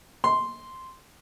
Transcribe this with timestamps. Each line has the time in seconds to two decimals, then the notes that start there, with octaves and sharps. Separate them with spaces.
0.24 C6